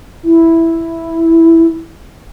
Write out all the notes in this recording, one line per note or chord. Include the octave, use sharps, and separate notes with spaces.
E4